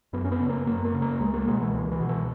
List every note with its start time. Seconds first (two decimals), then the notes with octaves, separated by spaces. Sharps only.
0.13 F#2 B3
0.25 C#4
0.32 B3
0.40 C#3
0.49 A#3
0.67 F#2 A#3
0.85 A#3
0.94 C#3
1.02 A#3
1.20 C#2 G#3
1.34 A#3
1.47 B2 G#3
1.60 E3
1.74 C#2 E3
1.91 E3
2.00 B2
2.09 E3